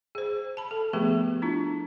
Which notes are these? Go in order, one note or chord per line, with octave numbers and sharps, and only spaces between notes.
G#4 C5
A5 B5
A4
F3 A3 B3 G4 G#4 B4
D4 E4 F4